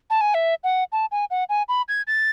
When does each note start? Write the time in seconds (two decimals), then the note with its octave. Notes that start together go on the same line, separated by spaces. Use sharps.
0.10 A5
0.21 G#5
0.34 E5
0.64 F#5
0.92 A5
1.11 G#5
1.30 F#5
1.49 G#5
1.69 B5
1.88 G#6
2.07 A6